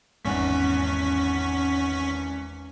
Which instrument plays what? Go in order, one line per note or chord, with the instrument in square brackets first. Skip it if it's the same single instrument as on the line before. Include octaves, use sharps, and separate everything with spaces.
[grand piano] G#1 E2 F#6 [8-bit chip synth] C#4 C#6 B6